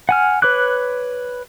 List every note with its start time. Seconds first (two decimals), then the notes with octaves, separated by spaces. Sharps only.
0.09 F#5 G#5 F6
0.42 B4 C#5 D6 F#6